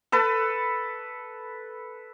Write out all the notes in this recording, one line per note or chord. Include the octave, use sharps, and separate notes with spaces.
A4 B4 A5